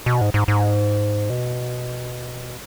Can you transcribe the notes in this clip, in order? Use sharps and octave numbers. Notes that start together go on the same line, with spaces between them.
B2
G#2
G#2
G#2
B2